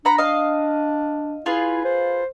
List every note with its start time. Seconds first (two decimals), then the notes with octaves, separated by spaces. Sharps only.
0.05 D4 F#5 A#5 B5
0.18 D#5 F5
1.46 E4 F4 G#4 B4
1.85 C5